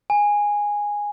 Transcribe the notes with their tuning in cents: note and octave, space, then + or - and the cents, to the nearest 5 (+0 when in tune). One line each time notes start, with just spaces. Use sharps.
G#5 -10